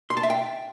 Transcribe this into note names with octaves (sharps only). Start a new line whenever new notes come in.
C6
A5
E5
G5